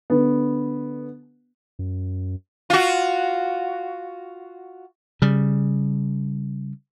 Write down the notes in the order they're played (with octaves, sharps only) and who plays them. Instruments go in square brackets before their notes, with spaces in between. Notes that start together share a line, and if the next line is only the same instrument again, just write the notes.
[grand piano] D3 B3
[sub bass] F#2
[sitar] F4 F#4
[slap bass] C#3 G3